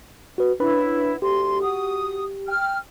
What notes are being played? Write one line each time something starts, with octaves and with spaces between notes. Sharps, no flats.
F#4 B4
B3 C#4 D4 E4 B4 B5
D2 G4 C6
F#4 D#6
G5 F6